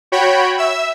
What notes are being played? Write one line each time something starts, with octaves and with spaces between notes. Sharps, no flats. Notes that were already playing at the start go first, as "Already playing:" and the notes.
F#4 C#5 G5 B5
E5 E6